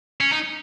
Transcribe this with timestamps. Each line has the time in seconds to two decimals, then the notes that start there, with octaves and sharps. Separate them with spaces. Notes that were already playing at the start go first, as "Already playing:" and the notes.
0.21 C#4
0.32 D#4